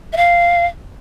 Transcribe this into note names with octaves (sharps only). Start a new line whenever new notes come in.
E5
F5